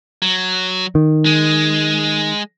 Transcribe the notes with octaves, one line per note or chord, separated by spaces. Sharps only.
F#3
D#3
G#3